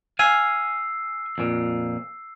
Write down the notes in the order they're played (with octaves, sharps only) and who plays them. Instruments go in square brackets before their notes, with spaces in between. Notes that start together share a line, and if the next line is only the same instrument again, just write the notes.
[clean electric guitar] F5 G#5 [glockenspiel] E6 C7
[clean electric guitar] F2 A#2